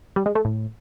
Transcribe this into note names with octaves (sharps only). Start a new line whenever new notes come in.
G3
G#3
A3
A2